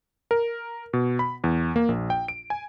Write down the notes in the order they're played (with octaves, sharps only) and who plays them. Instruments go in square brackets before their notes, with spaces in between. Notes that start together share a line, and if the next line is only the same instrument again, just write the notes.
[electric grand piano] A#4
B2
B5
E2
A#3
A#1
G5
D7
G#5